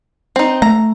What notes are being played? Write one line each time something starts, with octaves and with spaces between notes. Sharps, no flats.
C4 D#4
A3 A#5